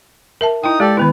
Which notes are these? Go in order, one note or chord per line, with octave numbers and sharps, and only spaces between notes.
A#4 E5 A5
D#4 E4 G5 D#6
G#3 G4 A4 D5
D#3 B3 E4 B4